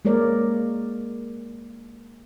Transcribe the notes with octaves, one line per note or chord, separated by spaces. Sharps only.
G#3 A#3 A#4 C#5 D5